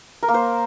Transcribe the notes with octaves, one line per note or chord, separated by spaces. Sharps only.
A#4
A#3
C5